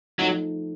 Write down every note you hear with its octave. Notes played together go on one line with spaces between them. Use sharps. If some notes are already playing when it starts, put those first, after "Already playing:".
F3 F#3 A3 D#4